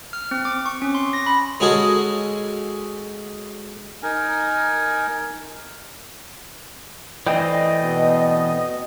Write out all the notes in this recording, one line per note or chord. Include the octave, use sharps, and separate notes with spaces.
F6
C4
D6
C#6
C#4
C6
A#6
B5
G#3 C#4 F#4 G#4 A4
D#4 A#4 G#5
E3 A3 C4 D5 D#5 G5
B2